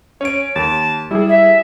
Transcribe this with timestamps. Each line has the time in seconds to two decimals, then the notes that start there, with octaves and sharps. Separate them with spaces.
0.21 C#4 C#5 D7
0.56 D#2 A5
1.11 G3 E4 G#4
1.29 E5